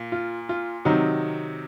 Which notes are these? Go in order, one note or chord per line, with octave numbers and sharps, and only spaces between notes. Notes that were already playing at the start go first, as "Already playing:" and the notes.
Already playing: A#2
F4
F4
C3 D#3 F#3 D#4